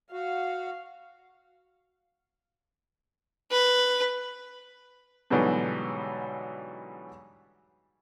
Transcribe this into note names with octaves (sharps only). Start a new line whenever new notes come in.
F#4 F5
B4
G#2 B2 D3 E3 F#3 G3